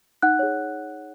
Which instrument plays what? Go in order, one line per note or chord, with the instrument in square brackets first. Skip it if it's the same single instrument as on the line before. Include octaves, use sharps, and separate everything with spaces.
[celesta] D#4 F#5 F#6
G#4 C#5